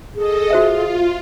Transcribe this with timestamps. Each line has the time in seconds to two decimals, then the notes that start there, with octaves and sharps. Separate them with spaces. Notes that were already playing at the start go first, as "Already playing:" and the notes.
0.15 G#4 A4 D#5
0.51 F4 F#4 C5 E5